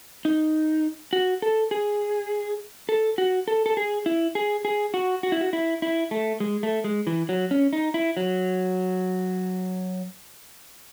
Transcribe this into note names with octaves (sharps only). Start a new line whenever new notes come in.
D#4
F#4
A4
G#4
A4
F#4
A4
A4
G#4
E4
G#4
G#4
F#4
F#4
E4
F#4
E4
E4
A3
G#3
A3
G#3
E3
F#3
C#4
D#4
E4
F#3